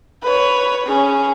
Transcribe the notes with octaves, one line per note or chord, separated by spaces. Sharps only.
B4 C#5
C#4 G#4